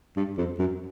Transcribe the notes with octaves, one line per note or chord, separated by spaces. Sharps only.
G2
F2
F#2